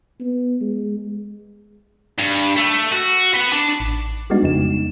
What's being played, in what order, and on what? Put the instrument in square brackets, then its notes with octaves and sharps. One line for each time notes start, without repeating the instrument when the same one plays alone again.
[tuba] B3
G#3
[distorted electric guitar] G2
A3
F#4
B4 F#5
D4
[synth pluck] A1
G3 G#3 B3 D4 D#4 F#4
F2 C#3 D#4 E7